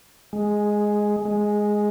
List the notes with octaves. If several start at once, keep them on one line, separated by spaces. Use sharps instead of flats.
G#3
G#3